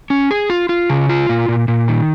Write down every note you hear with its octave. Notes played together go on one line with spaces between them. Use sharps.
C#4
G#4
F4
F4
C#3
F4
A#2
A#2
A#2
D#3